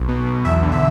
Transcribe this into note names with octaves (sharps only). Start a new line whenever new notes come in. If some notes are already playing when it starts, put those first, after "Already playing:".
Already playing: B1
B2
B1
E2 E5
D3
E5